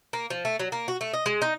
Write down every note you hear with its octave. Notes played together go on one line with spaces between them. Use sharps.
A#3
F3
A3
F#3
A#3
F#4
A3
D#5
G#3
D#4